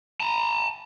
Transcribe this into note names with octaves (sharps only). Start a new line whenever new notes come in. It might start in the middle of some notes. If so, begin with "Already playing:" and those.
A5 A#5